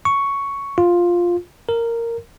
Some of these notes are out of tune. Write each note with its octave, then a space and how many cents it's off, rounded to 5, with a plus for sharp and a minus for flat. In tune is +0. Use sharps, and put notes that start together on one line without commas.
C#6 +5
F4 +5
A#4 -10